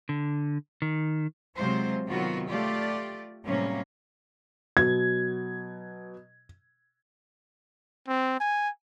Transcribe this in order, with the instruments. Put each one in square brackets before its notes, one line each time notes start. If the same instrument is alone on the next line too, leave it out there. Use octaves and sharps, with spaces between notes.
[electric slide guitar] D3
D#3
[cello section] C3 F#3 G#3 F4 C5
C3 D#3 F#3 B3 F4 F#4
A3 F4 G4 D5
A2 C3 F#3 G3 A#3 C#4
[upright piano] B2 F#3 [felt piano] G#6
[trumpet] C4
G#5